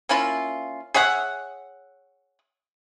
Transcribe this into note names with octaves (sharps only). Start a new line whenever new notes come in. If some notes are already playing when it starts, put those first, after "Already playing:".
A#3 C#4 E4 F4
G#4 C#5 E5 F#5